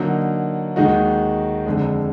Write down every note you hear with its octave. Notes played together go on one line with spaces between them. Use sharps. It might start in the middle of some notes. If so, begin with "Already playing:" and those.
Already playing: D3 F#3 A#3 D#4
D#2 D#3 G#3 D#4 F#4
F2 D3 G#3